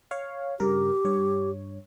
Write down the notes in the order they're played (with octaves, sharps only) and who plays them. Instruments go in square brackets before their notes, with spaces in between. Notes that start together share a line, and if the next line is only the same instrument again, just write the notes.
[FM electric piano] C#5 F5
[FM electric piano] G2 C#3 A#4 [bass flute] G4
[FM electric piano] G2 C#5